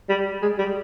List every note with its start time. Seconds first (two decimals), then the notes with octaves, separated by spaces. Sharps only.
0.09 G3
0.42 G#3
0.58 G3